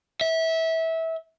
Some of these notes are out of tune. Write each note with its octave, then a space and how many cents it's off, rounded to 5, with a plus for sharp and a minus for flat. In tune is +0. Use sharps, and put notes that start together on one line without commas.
E5 -20